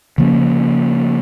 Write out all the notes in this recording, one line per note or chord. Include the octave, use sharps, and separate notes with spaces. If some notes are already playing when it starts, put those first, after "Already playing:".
C#3 F3 A#3 C#4